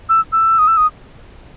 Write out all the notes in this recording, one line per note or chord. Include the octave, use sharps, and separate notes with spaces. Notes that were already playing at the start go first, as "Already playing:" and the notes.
E6
E6
D#6
E6
D#6